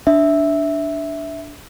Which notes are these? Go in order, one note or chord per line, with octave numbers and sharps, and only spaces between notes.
D4 E5